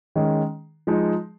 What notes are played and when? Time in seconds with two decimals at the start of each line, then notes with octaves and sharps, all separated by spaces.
0.16 D#3 G#3 C#4
0.87 F3 G#3 D#4